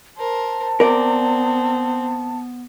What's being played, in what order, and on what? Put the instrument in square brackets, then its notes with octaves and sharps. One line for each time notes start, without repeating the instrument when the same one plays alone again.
[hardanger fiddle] A#4 C5 [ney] A5
[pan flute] B3 [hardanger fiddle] C4 [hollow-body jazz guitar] A#4 D5